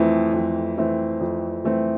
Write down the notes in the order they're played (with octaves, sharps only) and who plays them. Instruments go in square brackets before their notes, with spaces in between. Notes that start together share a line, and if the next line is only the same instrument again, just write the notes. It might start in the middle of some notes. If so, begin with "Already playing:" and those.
Already playing: [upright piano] F2 E3 A3 C4
F2
E3 A3 C4
F2
E3 A3 C4